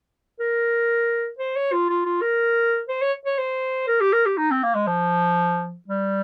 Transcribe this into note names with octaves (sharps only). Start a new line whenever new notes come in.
A#4
C5
C#5
F4
F4
F4
A#4
C5
C#5
C#5
C5
A#4
G4
A#4
G4
D#4
C4
A#3
G#3
F3
G3